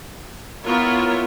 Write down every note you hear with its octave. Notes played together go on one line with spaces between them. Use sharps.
B3 E4 F4 A#4 C#5